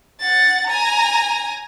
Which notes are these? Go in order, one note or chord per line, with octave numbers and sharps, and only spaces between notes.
F#5 A6
G#5 A#5